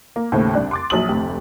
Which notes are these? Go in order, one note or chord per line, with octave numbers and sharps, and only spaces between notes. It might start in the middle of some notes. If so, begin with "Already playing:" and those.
A#3
D#2 A2 C#3 A3 C4
C2 D4 F#6
C6 D6 A6
A#1 F#3 D#6 F#7
F1 D2 G4